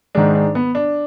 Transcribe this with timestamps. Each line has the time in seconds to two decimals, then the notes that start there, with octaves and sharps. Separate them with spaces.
0.15 G#2 D#3 G#3 D4
0.35 D4
0.55 B3
0.75 D4